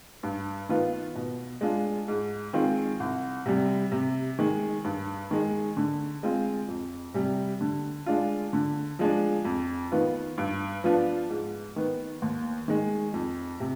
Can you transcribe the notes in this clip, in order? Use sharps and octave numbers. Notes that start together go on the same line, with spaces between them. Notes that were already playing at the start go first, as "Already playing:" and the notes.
G2
D#3 B3 F4
B2
G#3 D4 F4
G#2
D#3 G#3 C4 F4
C2
C3 G3
C3
D#3 G#3
G2
D#3 G#3
D3
G#3 C4 F4
F2
C3 G3
D3
G#3 D4 F4
D3
F3 G#3 D4
F2
D#3 B3 F4
G2
F3 B3 D4 F4
G#2
D#3 B3
D#2
D#3 G#3
F2
C3